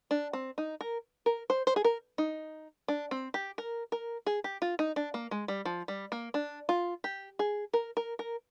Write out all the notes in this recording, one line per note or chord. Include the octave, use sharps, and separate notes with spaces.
D4
C4
D#4
A#4
A#4
C5
C5
G#4
A#4
D#4
D4
C4
G4
A#4
A#4
G#4
G4
F4
D#4
D4
A#3
G#3
G3
F3
G3
A#3
D4
F4
G4
G#4
A#4
A#4
A#4